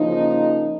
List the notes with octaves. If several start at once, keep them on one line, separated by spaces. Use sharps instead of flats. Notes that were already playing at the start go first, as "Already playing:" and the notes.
Already playing: C#3 F3 A#3 D#4